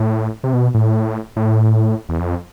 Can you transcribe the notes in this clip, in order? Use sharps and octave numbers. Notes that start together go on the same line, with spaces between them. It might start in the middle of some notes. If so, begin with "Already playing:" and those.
Already playing: A2
C3
B2
A2
A2
E2
F2